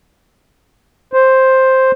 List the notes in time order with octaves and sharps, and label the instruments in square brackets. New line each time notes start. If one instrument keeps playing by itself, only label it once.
[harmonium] C5